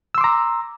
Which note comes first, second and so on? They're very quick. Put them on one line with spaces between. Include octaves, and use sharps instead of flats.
E6 C6 D6 A#5